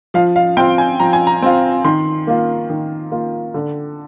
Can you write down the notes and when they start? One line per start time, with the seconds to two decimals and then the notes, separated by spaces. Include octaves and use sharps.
0.14 F3 F5
0.36 F5
0.57 C4 F4 G5
0.78 G#5
1.00 F3 A#5
1.13 G#5
1.27 A#5
1.42 C4 F4
1.84 D#3 C6
2.27 A#3 F4
2.70 D#3
3.12 A#3 F4
3.54 D3